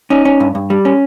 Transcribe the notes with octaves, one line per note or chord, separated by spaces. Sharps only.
C#4 D#4
C#4
G2
G2
G3
C#4